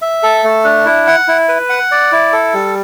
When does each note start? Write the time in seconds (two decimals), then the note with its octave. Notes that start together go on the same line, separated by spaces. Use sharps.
0.02 E5
0.23 A4
0.44 A3
0.64 D4
0.86 E4
1.07 F#5
1.28 E4
1.49 B4
1.70 F#5
1.91 D5
2.12 E4
2.33 A4
2.54 G3